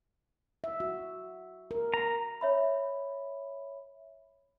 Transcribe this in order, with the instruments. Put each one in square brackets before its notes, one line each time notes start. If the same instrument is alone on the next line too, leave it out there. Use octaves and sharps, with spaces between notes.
[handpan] E5
F#4
A#4
[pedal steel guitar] A#5
[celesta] C#5 E5 B5